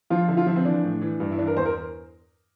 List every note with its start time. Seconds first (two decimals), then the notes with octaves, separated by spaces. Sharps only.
0.10 F3 F4
0.28 D3 E4
0.37 F4
0.47 F3 E4
0.56 C4
0.65 E3 D4
0.84 A2
1.01 E3
1.20 G2
1.32 E4
1.38 E3 D4
1.47 A#4
1.57 E2 C5
1.66 A#4